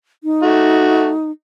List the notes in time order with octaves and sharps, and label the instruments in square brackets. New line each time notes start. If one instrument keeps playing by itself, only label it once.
[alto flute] D#4
[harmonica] A3 F#4